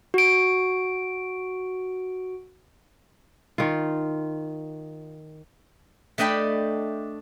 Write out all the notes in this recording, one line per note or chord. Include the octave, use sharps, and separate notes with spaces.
F#4 D7
D#3 F4
A3 D4 D#5 G5 B5